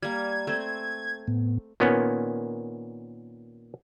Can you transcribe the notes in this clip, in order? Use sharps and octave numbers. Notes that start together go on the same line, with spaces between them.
G3 A#3 G#6
A3 C4 C5
A2 B3
A#2 D#3 B3 C#4